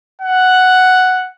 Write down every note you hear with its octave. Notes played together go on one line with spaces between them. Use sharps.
F#5